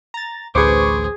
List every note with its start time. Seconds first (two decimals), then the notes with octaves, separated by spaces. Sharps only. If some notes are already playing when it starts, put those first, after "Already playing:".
0.14 A#5 A6
0.55 A1 D2 G#4 B4 C5 C#6 D6